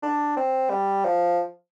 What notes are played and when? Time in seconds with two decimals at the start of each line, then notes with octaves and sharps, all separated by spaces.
0.03 D4
0.36 C4
0.70 G3
1.05 F3